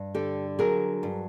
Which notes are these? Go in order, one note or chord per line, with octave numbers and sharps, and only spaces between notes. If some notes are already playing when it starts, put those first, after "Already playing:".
Already playing: G2
D3 G4 A4
F#3 G#4 A#4
G2